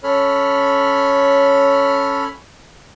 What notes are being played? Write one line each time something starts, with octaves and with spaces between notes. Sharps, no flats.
C#4 A4 C#5 B5 F6